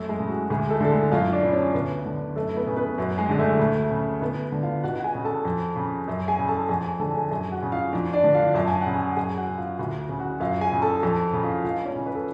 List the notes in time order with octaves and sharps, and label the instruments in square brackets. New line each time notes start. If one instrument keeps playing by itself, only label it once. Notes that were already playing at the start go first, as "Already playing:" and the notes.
Already playing: [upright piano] F#2 A3 A4
G#3 G#4
C#3
F#4
D2 G#3 G#4
A3 A4
D3 A4
G#3 G#4
F#2 F4 F5
D4 D5
C#3
C#4 C#5
D2 B3 B4
D3
F#2 A3 A4
B3 B4
C#3
B3 B4
F#2 F#4
G#3 G#4
D3 G#4
A3 A4
D2
C#3
D2 B3 B4
D3
F4 F5
C#2 F#4 F#5
F#5
G#4 G#5
C#3
A4 A5
F2
C#3
F#2
G#4 G#5
C#3
A4 A5
F2 G#4 G#5
G#4 G#5
D3 A4 A5
G#4 G#5
F#2 G#4 G#5
F#4 F#5
C#3
F4 F5
F2 D4 D5
D4 D5
D3
F4 F5
F#2 A5
G#5
C#3 F#5
G#4 G#5
F#5
F#2 G#4 G#5
F#4 F#5
C#3
F4 F5
D2 F#4 F#5
C#3
F#4 F#5
F#2 F4 F5
G#4 G#5
C#3
A4 A5
F2 A4 A5
C#3
F4 F5
C#2 F4 F5
C#4 C#5
C#3
B4
A4